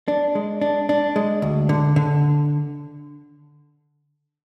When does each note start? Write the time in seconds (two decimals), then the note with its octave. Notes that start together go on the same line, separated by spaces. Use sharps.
0.08 D4
0.35 G#3
0.61 D4
0.89 D4
1.16 G#3
1.42 D2
1.69 D3
1.96 D3